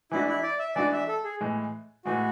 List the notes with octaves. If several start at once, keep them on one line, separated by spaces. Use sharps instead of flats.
E3 G#3 D4 E4 F#4
E4
D5
E5
E3 G#3 D4 F#4 D5
E5
A4
G#4
A2 E3 G#3
A2 E3 G#3 F#4